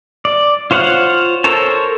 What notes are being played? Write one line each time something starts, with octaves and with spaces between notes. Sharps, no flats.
D5
F4 C5 C#5 F5 F#5
A4 A#4 C5 C#5 A5